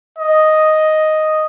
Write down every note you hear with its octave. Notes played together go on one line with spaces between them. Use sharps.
D#5